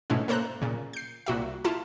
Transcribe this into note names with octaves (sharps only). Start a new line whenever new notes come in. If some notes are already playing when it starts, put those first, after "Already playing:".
G#2 B2 A3 C#4 E4
A#3 A4 C5 A#5 F#6
A#2 C#3
G6 C7
C2 A#2 F#4 E5
E4 F4 A5